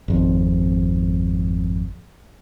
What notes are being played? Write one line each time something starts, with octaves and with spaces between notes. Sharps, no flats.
G#1 F2